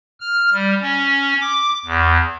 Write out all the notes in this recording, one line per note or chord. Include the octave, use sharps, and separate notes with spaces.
F6
G3
C#4
D6
E2